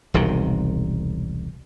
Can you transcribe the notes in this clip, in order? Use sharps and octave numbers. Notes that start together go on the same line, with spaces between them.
E1 C2 C3 D#3